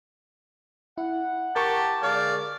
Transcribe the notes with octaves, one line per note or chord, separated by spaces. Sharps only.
E4 F#5
G4 A#4 A5 C#6
D3 G#3 G#4 D5 F5